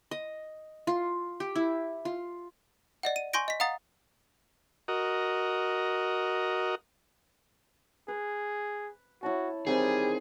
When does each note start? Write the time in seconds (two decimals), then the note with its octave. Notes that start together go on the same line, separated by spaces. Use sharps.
0.11 D#5
0.87 F4
1.40 G4
1.56 E4
2.05 F4
3.03 D5 D#5 F#5
3.16 D#7
3.33 G#5 C6 C#6 G6 A#6 D7
3.48 D#5 B6
3.60 F5 F#5 A#5 D#6 A6
4.88 F#4 A#4 D#5
8.08 G#4 B4
9.23 E4 F#4 C#5 A5
9.67 D#3 E3 G3 C4 G#4